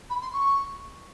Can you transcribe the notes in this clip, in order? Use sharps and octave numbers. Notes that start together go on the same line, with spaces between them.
B5
C6
C#6